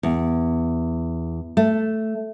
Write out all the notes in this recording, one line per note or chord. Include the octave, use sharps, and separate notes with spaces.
E2
A3